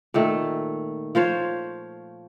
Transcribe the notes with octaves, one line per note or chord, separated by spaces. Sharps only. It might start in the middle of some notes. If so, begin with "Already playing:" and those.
A#2 D#3 A3
F3 F4 C5 C#5